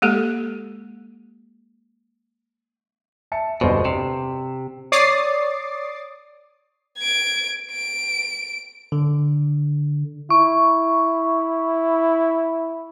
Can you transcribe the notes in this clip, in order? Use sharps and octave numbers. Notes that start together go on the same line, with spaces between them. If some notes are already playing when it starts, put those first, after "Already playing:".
G#3 A#3 G4 A4
E5 A5 C#7
G1 B2 C5 D#5
C3 E7
C#5 D5 D6 D#6 A6 C7
G#6 D7
D7
D3
E4 C#6